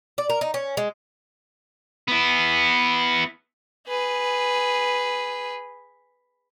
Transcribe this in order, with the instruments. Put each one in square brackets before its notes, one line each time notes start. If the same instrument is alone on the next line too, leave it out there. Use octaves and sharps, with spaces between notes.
[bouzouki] D5
A#4
D#4
C#4
G#3
[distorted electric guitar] B3 E4
[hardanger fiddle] G#4 B4